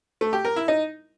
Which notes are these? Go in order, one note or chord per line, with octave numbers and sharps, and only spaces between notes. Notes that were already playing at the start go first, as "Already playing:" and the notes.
A3
G4
A#4
E4
D#4